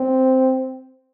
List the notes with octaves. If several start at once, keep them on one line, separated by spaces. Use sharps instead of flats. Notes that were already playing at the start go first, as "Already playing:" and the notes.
Already playing: C4